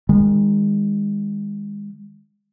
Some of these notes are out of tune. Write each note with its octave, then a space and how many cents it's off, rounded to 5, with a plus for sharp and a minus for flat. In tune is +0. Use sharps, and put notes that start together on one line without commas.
D#3 -10 G#3 -35